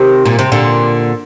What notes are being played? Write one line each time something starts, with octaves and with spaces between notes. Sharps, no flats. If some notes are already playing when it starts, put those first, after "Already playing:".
Already playing: C3 D#3
A#2
C3
A#2 D3